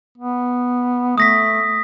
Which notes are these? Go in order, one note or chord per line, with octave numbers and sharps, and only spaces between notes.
B3
A3 D#6 A#6 B6